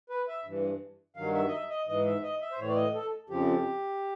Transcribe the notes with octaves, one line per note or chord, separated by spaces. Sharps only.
B4
E5
G2 E3
G2 D#3 F#3 F5
E5
D#5
E5
D#5
G#2 E3 D#5
E5
D#5
E5
C5
A2 E3 C#5
D5
D#5
A4
F2 C#3 F3 G4